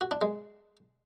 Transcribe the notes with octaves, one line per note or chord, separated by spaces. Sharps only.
F#4
D4
G#3